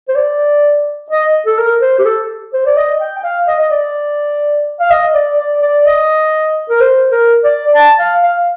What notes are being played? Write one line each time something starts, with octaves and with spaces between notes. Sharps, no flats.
C5
D5
D#5
A4
A#4
C5
G4
A4
C5
D5
D#5
G5
G5
F5
D#5
D#5
D5
F5
D#5
D5
D5
D5
D#5
A#4
C5
A#4
D5
A5
F5
F5